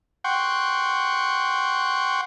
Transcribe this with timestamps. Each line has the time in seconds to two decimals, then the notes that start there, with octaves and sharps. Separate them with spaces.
0.24 F#5 G5 C6 C#6